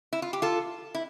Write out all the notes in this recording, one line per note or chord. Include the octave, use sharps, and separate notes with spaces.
E4
F4
G4
F4 A4
E4